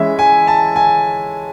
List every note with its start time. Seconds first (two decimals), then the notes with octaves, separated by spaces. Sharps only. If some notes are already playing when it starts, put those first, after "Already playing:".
Already playing: E3 G#3 C#4 E4 E5
0.19 G#5
0.47 A5
0.76 G#5